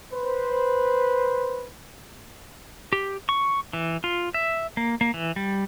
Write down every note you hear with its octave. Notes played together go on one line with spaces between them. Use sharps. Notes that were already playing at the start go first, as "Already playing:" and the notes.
B4 C5
G4
C#6
E3
F4
E5
A#3
A#3
E3
G3